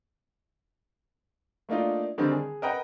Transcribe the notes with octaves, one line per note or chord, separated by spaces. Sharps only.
A3 A#3 D4 D#4 F4
D3 D#3 G3 C4
G#4
A#4 B4 D#5 F#5 G5 A#5